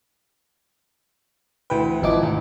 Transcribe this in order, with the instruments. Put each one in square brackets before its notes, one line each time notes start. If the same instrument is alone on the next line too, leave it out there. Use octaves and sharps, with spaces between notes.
[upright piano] D2 G5 [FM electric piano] E3 B4
[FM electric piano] G#1 D#4 D6 [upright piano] E3 F3 E4
[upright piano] D2